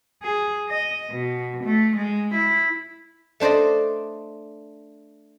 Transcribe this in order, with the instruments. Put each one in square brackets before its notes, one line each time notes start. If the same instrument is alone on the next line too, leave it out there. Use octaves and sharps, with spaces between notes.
[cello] G#4
D#5
B2
A3
G#3
E4
[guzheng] A3 D4 C5 D5 D#5